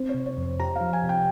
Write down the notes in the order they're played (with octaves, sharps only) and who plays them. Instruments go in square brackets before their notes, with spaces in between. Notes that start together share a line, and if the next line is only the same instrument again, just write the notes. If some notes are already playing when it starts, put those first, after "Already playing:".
Already playing: [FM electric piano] C4 [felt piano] C5
[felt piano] C#5
[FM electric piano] C3
[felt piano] C#5
[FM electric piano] F2 [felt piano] C5
[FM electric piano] G4 [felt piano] A#5
[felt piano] F5
[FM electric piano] F3
[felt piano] G#5
[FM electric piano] C3
[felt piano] G5